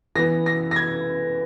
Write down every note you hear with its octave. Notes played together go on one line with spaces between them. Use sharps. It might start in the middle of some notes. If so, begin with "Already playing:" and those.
E3 B3 A#6
A#6
A#6
G#6